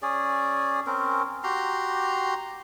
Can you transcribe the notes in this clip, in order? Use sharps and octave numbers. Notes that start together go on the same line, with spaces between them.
C#4 G#4 D5
C4 C#4 A#4
F#4 G4 A#5 C6